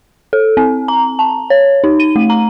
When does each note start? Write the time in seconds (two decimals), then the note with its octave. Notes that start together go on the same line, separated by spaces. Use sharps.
0.33 A4
0.57 C4
0.88 A#5
1.19 A5
1.50 C#5
1.84 D#4
2.00 D#7
2.16 A3
2.30 A#5